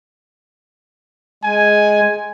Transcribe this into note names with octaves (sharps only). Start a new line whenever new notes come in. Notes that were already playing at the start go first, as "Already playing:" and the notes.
G#3 G#5